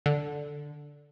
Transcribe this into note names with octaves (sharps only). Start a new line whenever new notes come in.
D3